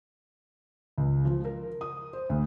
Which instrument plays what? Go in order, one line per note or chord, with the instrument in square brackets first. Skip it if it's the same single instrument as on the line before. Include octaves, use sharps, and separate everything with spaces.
[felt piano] C#2
F3
A#4
D#6
C5
D2